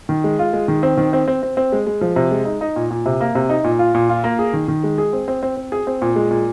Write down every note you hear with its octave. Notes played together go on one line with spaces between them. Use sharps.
D#3
G#3
F4
G#3
D#3
C4
D#3
C4
C4
C4
C4
G#3
G#3
F3
C3
G#3
D#4
D#4
A#2
A#2
C3
A#3
C3
D#4
A#2
F4
A#2
F4
A#3
G#4
D#3
D#3
G#3
G#4
C4
C4
C4
C4
G#4
C4
A#2
G#3
A#2